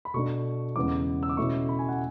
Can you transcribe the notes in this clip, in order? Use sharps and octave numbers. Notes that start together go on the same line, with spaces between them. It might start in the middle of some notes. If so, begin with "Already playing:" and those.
B5
B2 A3 D4 C#6
E2 C#3 G#3 B3 D6
E6
D6
B2 A3 C#4 E4 C#6
B5
G#5
F#5